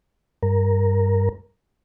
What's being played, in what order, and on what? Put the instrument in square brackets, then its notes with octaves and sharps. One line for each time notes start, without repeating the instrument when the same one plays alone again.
[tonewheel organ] G2 A#4